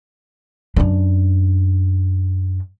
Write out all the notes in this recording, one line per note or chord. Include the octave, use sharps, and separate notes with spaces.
F#2 D4